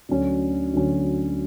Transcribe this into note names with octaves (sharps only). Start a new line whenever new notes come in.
D2 D3 F#3 C#4
D2 D3 F#3 C#4